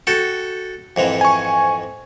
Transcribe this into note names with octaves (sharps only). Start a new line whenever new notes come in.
F#4 A4 G5
F2 G#2 E3
G#5 C#6